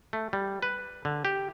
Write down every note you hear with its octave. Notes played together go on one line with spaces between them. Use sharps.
A3
G3
B4
D3
G4